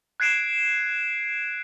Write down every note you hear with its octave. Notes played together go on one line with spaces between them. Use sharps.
F#6 G#6 C7 D7 E7